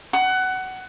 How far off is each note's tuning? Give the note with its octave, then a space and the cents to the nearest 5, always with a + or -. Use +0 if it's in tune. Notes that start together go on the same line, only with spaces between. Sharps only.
F#5 +20